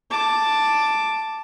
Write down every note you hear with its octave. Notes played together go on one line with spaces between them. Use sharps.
A5 D6